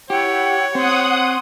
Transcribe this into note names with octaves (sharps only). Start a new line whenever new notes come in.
E4 G4 C#5 F#5 G5
C4 F#5 C6 D#6